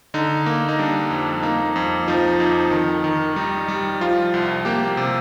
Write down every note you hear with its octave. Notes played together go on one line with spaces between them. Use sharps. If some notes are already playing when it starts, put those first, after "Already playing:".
D3 D#4
A#3
D#4
G3 D4
F2
A#3 D#4
F2
F3 D#4
F2 D#4
D#3
D#3
G3 D#4
G3
F3 F4
C2
A#3 G4
C3